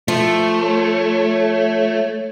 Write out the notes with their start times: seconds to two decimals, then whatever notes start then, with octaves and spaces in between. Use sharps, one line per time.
0.08 F3 A3
0.61 C#5